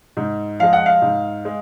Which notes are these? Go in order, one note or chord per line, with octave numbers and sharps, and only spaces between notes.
G#2
F3 G#3 F5
F#5
F5
G#2
G#3